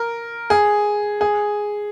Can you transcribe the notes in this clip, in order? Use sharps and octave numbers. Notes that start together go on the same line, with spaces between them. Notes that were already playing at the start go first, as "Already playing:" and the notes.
Already playing: A#4
G#4
G#4